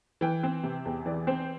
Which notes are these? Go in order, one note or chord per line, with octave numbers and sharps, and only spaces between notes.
E3 G5
C4
C3
E2
E3 D5
C4 C5